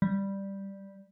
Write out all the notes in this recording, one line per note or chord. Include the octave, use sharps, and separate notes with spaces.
G3